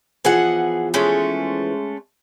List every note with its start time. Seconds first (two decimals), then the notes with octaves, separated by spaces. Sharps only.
0.25 E3 F3 B3 G#4 F#5
0.94 G#3 A3 C#4